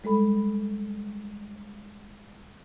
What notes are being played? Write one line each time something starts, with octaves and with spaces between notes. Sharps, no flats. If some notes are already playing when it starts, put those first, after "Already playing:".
G3 G#3 A4 B5